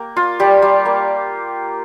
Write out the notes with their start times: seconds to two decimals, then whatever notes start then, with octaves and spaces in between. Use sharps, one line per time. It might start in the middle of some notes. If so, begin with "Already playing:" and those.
Already playing: A#3 G4
0.16 F4
0.40 G3 G4
0.62 G3
0.85 A#3